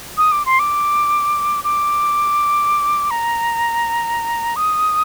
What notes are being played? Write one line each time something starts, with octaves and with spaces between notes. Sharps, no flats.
D#6
D6
C6
D6
D6
A#5
D#6